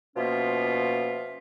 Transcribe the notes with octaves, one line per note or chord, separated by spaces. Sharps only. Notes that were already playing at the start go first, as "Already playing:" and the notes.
B2 F3 A#3 C#4 F4 E5